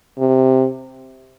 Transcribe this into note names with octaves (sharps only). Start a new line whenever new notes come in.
C3